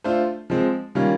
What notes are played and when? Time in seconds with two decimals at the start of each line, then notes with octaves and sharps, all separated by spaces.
0.04 A3 D4 F4 A4 C5
0.50 F3 G#3 C4
0.95 D#3 G3 A#3 C#4 F4